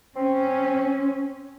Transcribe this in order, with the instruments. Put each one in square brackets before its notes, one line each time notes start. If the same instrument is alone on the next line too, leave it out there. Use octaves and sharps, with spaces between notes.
[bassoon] C4 [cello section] C#4